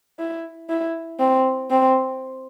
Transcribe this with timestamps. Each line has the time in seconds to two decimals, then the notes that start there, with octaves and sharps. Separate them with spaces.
0.19 E4
0.69 E4
1.20 C4
1.71 C4